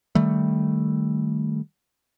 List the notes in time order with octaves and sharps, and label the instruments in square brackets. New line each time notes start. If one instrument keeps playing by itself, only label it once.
[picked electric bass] D#3 G3 A3